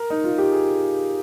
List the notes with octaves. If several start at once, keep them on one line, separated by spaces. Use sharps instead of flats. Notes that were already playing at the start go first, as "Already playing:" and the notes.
Already playing: A#4
D#4
F4
G4
G#4